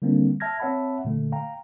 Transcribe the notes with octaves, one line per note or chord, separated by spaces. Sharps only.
D3 G3 A#3 C4 D4
E5 A5 F6 G#6 A#6
C4 C#5 E5 F#5 A5 B5
A#2 D3 A3
F5 G5 A#5